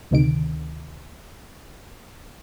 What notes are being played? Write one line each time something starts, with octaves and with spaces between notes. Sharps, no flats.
D2 C3 D#3 D7